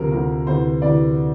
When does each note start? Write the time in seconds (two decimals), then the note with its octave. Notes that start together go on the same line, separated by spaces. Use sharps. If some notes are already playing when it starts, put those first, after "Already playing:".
Already playing: D2 C3 F3 A#4
0.11 D2 C3 F3
0.47 D2 C3 E3 C5
0.82 D2 C3 E3 D5